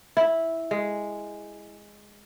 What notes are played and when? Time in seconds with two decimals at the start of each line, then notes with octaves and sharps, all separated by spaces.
0.17 E4
0.71 G#3